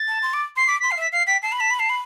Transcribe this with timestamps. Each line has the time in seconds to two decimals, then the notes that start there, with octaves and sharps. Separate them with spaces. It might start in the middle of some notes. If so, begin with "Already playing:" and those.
Already playing: A6
0.08 A5
0.22 C6
0.33 D6
0.56 C6 C7
0.67 D6 B6
0.79 B6
0.83 C6
0.90 F5 C7
0.97 E5 B6
1.12 F5 C7
1.26 G5 B6
1.42 A5 C7
1.52 B5
1.57 A5 B6
1.71 B5
1.79 A5 C7
1.89 B5